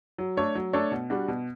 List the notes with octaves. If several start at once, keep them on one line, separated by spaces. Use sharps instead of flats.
F#3
A3 D4 A4 C#5
F#3
A3 D4 A4 C#5
B2
G3 D4 F#4
B2